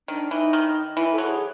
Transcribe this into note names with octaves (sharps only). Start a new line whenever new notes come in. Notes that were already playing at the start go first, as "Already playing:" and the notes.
D#3 D4
E3 D#4
D#3
E3 E4
A4
F#3
G#4